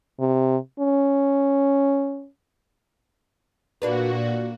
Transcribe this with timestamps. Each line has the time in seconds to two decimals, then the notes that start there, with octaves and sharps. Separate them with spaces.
0.20 C3
0.79 C#4
3.82 A#2 A#3 D4 F#4 B4